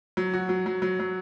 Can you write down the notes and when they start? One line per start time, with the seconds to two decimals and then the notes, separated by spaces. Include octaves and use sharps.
0.17 F#3
0.34 F#4
0.49 F#3
0.66 F#3
0.82 F#3
1.00 F#3